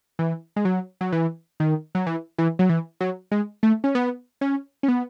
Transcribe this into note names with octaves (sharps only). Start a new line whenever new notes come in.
E3
G#3
F#3
F#3
E3
D#3
F#3
E3
E3
F#3
E3
F#3
G#3
A3
C#4
B3
C#4
C#4
B3